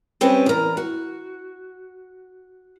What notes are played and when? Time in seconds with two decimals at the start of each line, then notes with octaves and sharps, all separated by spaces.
0.21 G3 C4 C#4 B4 D#5
0.46 E2 A#4
0.77 F#4